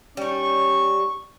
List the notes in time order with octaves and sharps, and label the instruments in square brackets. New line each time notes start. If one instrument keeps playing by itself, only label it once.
[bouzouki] G3 D#4 [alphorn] C#4 [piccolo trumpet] C#6